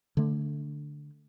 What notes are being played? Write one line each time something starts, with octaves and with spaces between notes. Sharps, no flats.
D3 A3